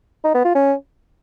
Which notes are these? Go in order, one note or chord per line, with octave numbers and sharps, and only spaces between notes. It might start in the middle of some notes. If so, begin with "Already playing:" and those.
D#4
B3
F4
C#4